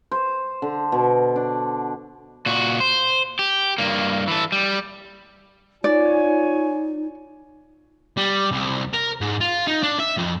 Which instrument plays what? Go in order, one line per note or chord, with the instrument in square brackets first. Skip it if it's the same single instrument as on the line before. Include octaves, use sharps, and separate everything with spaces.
[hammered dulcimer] C5
D3
B2
D4
[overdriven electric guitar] A#2 F#4
C5
G4
G2 A#3
E3 A4
G3
[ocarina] D#4 [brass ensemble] F4 C#5 G#5 [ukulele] D5
[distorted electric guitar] G3
C2
A#4
G#2
F4
D#4
D4
E5
F2